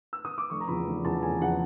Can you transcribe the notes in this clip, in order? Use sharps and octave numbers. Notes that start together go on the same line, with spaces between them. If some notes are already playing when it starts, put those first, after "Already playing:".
E6
D#6
D6
F1 C#6
A#5
E2 C#3 F3 B5
F1
E2 C#3 F3 A5
F1 G#5
E2 C#3 F3 F#5